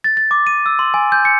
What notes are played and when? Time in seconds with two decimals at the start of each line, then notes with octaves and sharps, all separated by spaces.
0.04 A6
0.17 A6
0.31 D6
0.47 D#7
0.66 E6
0.79 C6
0.94 G#5
1.12 G6
1.25 C#7